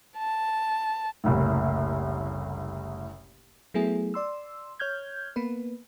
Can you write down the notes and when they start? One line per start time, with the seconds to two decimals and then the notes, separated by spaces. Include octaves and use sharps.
0.18 A5
1.24 F#1 C2 A2
3.74 F#3 A3 B3 E4 G#4
4.14 D5 C6 E6
4.80 C#5 F6 G6 G#6
5.36 A#3 B3 B4